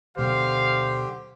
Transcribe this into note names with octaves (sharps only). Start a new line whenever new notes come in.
D2 B2 D3 F#3 G4 C5 F5